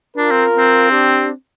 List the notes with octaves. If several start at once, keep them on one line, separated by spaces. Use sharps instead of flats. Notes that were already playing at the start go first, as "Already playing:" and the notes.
D4 F4 A#4
C4
C4
D4 G4